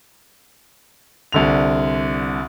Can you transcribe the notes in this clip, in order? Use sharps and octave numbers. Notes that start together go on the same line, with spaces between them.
C2 D3 F7